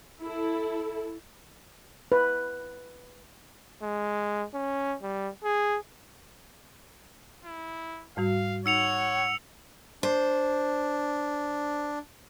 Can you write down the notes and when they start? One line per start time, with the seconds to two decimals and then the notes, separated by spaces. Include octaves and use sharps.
0.22 E4 A4
2.12 B4
3.82 G#3
4.54 C#4
5.02 G3
5.44 G#4
7.45 E4
8.17 G#2 G3 F#4 F5
8.66 D#4 C#5 F#5 E6 C#7 F7
10.03 D4 C5